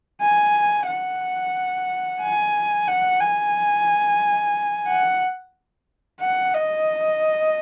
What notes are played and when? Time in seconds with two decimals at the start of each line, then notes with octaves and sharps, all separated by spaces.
0.21 G#5
0.87 F#5
2.21 G#5
2.88 F#5
3.21 G#5
4.88 F#5
6.21 F#5
6.54 D#5